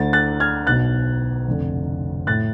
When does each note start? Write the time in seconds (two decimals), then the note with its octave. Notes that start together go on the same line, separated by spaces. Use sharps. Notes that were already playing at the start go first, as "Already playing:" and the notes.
Already playing: D2 D3 A6
0.13 F#6 A6
0.40 F6 G#6
0.67 B1 B2 F#6 A6
1.47 F1 F2 D3
2.27 A2 F#6 A6